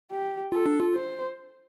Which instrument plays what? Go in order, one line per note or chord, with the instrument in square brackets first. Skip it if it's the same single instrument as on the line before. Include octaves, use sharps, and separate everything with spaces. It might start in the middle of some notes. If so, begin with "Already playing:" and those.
[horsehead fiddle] G4
[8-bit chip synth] F4 [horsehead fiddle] A4
[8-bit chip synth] D4
F4
[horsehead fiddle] C5